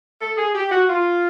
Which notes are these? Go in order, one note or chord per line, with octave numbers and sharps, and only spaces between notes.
A4
G#4
G4
F#4
F4